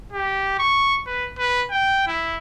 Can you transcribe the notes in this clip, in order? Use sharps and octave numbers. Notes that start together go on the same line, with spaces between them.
G4
C#6
B4
B4
G5
E4